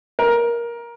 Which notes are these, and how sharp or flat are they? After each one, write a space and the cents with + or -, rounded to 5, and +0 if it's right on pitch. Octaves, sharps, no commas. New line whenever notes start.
A#4 +15